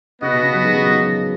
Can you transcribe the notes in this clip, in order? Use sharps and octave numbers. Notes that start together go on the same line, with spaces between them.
C#3 B3 F#4 B4 D#5
B2
C#3
C#3 F#3
D#3 G#3
C#3 F#3
B2 D#3